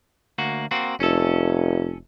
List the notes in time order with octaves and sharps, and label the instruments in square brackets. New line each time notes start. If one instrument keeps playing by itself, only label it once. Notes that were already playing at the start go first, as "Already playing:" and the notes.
[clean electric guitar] D2 A#3 F#4
A#3 C4 F#4
[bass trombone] F1 [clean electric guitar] C#4 A4